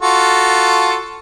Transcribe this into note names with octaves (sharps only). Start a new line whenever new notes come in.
F4 F#4 A4